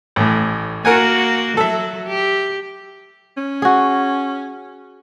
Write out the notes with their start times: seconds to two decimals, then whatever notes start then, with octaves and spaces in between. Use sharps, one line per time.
0.16 A1 A2
0.85 A#3 F#4 A#4 F#5 G#5
1.57 F#3 A4 E5
2.07 G4
3.37 C#4
3.62 F#4 G#4